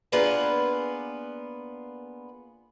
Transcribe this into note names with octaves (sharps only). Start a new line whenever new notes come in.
A#3 B3 D4 F4 G#4 B4